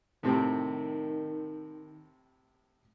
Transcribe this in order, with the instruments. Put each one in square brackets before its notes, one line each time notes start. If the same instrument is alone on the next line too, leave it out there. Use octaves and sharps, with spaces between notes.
[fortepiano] A2 C3 C4 [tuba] D#3